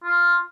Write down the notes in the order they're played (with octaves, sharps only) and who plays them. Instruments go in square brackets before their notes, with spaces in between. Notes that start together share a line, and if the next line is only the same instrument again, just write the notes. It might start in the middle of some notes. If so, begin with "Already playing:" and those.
[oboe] F4